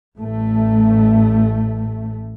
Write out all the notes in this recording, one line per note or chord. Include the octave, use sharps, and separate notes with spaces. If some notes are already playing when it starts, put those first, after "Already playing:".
A1 A2 A3